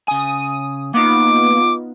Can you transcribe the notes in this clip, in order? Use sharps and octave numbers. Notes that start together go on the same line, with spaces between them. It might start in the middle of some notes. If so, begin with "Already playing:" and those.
C#3 G#5 D#6
A#3 B3 D#4 F4 D6